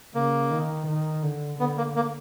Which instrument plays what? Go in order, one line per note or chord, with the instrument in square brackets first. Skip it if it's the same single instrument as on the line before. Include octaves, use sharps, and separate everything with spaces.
[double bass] C#3 [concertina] A#3
[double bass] D#3
D#3
D3
[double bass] D3 [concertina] B3
[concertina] A#3
A#3